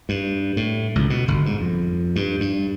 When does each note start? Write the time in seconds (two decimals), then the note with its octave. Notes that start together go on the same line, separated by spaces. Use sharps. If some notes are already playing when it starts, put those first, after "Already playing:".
0.09 G2
0.57 A2
0.95 C#2
1.10 B2
1.28 G1
1.46 G#2
1.61 F2
2.16 G2
2.40 G2